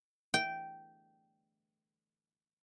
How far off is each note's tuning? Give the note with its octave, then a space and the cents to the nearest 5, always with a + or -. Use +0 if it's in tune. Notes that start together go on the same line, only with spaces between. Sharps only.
G5 -10